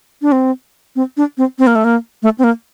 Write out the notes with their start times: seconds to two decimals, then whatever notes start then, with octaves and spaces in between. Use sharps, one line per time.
0.22 D4
0.32 C4
0.96 C4
1.17 D4
1.38 C4
1.59 C4
1.67 A#3
1.75 A3
1.84 A#3
2.23 A3
2.38 C4
2.44 A#3